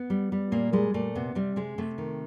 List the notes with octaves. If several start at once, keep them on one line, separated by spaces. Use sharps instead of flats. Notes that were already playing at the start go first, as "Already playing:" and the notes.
Already playing: B3
G3
G3
A#2 A#3
G3 G#3
A#2 A3
C3 B3
C3 G3
C3 G#3
C3 A3
D#3